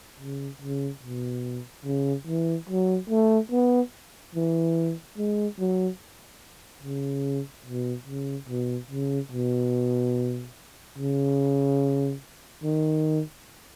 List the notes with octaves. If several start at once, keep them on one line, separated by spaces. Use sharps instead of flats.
C#3
C#3
B2
C#3
E3
F#3
A3
B3
E3
G#3
F#3
C#3
B2
C#3
B2
C#3
B2
C#3
D#3